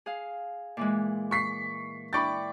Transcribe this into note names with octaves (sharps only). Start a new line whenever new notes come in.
G#4 F5
A#2 E3 G#3
C#6 B6 C7
E4 D5 G5 B5 C#6 A6